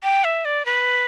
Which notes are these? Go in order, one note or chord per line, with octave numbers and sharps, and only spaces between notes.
G5
E5
D5
B4